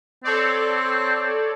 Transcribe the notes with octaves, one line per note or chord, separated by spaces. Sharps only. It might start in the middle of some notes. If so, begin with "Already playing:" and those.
C4 A4 C#5 D5